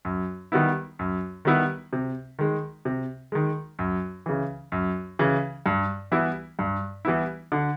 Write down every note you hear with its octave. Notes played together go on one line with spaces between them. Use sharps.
F#2
D#3 G3 B3 E4
F#2
D#3 G3 B3 E4
C3
D#3 G#3
C3
D#3 G#3
F#2
C#3 E3
F#2
C#3 E3
G2
E3 G3 B3 E4
G2
E3 G3 B3 E4
D3